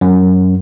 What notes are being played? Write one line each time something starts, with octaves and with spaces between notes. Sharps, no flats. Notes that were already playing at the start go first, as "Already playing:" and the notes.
F#2